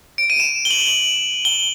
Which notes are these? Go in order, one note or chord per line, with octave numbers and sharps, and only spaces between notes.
D7
D#7
E7
G7
F#7
G7